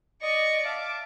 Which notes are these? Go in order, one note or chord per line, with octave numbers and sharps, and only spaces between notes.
D5 D#5 C#6
E5 F5 A5 D6